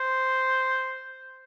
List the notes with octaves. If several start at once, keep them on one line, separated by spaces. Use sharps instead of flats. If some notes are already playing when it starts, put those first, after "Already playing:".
Already playing: C5